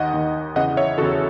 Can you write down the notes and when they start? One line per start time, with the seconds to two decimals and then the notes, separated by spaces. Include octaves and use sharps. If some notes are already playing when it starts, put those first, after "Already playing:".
Already playing: D#2 D#3 D#5 F#5
0.14 D#2 D#3
0.56 E2 C#3 E3 D#5 F#5
0.77 C#5 E5
0.98 E2 C#3 E3 F#4 A4